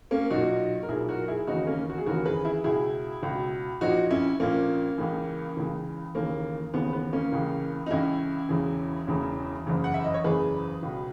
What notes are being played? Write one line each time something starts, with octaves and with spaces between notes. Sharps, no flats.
A#3 C#4
B1 A#2 D#4 F#4
A#4
B1 A#2 E4 G#4
F#4 A#4
E4 G#4
D#2 C#3 E3 D#4 F#4
A#3 C#4
F#4
G#4
D#2 C#3 E3 F#4 A#4
G#4 B4
E4 G#4
C#2 B2 E4 G#4
C#2 B2
A#1 A#2 D#4 F#4
C#4 E4
A#1 A#2 A#3 C#4
C#2 C#3 E3
C#2 C#3 E3
D#2 C#3 E3 A#3
D#2 C#3 E3 B3
B3
A#3 C#4
C#2 C#3 E3
D#4
C#2 C#3 E3 C#4 E4
E1 E2 C#3 E3
E1 E2 C#3 E3
F#1 E2 C#3 E3
F#5
E5
D#5
C#5
F#1 E2 C#3 E3 G#4 B4
C#2 B2